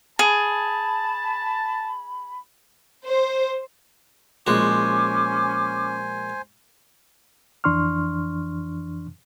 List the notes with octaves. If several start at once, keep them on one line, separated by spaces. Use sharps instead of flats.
G#4 A5 B5
C5
A#1 G#3 C#4 F#4 C5 G#5 D6
F2 E3 D4 C6 C#6 F6